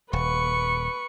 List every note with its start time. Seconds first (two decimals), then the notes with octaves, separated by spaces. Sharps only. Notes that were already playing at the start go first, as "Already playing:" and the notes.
0.13 D#1 B4 C#6